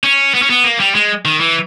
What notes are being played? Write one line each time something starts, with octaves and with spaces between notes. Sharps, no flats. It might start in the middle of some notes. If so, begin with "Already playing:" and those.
C#4
B3
C#4
B3
A#3
G3
G#3
D#3
E3